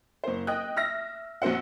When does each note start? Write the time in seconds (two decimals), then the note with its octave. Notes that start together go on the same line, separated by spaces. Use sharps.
0.24 F#1 C5
0.47 D#5 G5 D#6 F#6
0.76 E5 F6 A#6
1.42 A#1 C4 F#4 C5 F#5